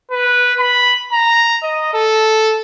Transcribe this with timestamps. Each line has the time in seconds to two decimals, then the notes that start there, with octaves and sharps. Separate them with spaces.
0.11 B4
0.59 B5
1.13 A#5
1.63 D#5
1.93 A4